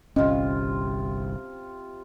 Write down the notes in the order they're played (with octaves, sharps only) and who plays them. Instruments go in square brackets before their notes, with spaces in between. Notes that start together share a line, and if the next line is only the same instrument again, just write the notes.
[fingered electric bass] G1 C2 [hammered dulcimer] C3 F4 [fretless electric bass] C#4 [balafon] D#5